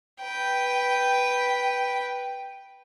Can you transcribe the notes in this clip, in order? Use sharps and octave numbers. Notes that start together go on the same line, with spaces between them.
B4 G5